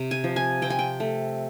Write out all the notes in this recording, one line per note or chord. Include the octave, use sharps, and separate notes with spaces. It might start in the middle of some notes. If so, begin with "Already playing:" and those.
Already playing: C3
G#5
F3
G#5
C4 G5
G#5
G5
A3